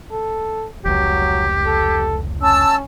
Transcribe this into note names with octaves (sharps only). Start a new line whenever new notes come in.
A4
F1 C#2 F#3 G4
A4
C#4 A5 E6